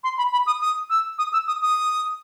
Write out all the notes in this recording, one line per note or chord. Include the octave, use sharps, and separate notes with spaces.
C6
B5
B5
D#6
D#6
E6
D#6
E6
D#6
D#6